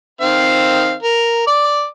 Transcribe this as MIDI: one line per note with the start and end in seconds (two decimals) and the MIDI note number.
0.21 0.95 51
0.21 0.95 60
0.21 0.95 77
1.03 1.45 70
1.47 1.85 74
1.47 1.85 86